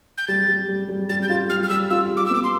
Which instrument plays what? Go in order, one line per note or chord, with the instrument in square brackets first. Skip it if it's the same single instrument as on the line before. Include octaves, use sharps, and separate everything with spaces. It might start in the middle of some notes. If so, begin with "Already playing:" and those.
[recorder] G6
[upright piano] G3 [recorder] A6
[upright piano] G3
G3
G3
[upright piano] G3 [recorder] A6
[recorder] G6
[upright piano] F4 [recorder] A6
[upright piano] G3 [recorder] F6
[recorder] F6
[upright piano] G3 [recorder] E6
[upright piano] F4 [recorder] E6
[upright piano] G3
[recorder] D6
E6
[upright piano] B3 [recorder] D6
[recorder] C6